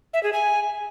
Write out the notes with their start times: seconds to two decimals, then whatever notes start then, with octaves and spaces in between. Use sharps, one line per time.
0.14 E5
0.23 G#4
0.33 G#5